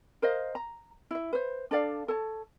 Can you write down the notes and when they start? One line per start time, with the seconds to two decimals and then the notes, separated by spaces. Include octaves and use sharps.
0.22 A#4 C5 D#5 F5
0.55 A#5
1.11 E4 E5
1.33 B4 C5
1.71 D4 A4 D5 F5
2.08 A4 C#5 A5